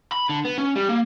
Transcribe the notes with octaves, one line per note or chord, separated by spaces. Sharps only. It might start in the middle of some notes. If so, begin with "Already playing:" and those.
B5
D3
B3
C#4
G3
A#3